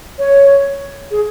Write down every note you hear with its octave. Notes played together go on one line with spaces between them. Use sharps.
C#5
G#4